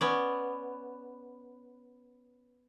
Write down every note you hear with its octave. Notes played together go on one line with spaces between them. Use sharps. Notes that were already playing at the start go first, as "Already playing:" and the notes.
B3 C#4 D5